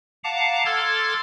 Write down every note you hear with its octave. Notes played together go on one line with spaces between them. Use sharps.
F5 F#5 A5 A#5 D6
A4 C6 D6 F6 G#6 A6